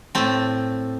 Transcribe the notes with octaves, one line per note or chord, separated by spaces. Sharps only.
A2 A3 C4